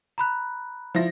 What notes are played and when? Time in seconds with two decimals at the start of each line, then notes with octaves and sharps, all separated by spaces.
0.18 A#5 B5 F#6
0.95 F3 E4 A#6